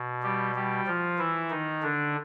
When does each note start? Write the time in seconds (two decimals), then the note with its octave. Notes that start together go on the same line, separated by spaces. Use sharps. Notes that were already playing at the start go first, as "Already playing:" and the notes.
Already playing: B2
0.23 G3 G4
0.55 G3 G4
0.87 F3 F4
1.18 E3 E4
1.50 D#3 D#4
1.82 D3 D4